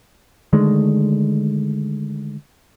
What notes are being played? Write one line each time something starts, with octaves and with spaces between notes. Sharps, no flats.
D3 D#3 G#3 A3